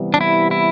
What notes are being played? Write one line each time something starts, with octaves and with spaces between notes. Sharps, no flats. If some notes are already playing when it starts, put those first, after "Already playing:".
Already playing: C3 E3 G3 B3
D4
E4
E4